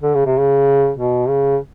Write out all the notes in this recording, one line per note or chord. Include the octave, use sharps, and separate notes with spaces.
D3
C#3
C3
C#3
B2
C#3